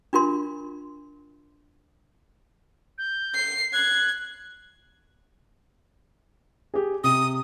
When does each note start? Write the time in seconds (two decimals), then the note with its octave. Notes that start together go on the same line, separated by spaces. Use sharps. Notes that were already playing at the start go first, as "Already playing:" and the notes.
0.13 D4 F4 A#4 C6
2.98 G6
3.35 C7
3.73 F#6 G#6
6.74 G4 G#4
7.04 C3 D#6